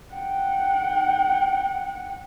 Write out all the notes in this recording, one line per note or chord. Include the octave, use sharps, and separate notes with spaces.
F#5 G5